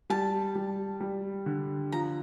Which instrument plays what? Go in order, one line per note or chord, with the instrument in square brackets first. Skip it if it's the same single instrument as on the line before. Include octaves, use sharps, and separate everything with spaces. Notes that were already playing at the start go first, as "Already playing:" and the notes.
[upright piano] G3 [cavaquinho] A5
[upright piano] G3
G3
D3
[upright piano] F3 [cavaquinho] A#5